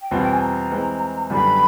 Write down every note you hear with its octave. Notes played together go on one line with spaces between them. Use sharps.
G5
E2 B2 G3 C4 F4 F#5
G5
G#5
A#5
E3 G#3 C4
F#2 D3 G3 B3 D4 B5